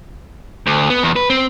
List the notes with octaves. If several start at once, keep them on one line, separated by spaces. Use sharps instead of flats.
D2
B3
E2
B4
C4